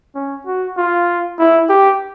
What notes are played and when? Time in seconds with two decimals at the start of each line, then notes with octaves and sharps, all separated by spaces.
0.15 C#4
0.46 F#4
0.77 F4
1.39 E4
1.69 G4